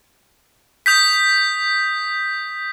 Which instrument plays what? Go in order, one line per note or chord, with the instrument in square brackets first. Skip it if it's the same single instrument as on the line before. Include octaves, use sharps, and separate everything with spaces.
[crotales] D#6 G6 B6